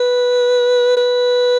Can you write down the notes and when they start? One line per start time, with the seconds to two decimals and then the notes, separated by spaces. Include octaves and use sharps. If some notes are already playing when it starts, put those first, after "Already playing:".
Already playing: B4
0.97 B4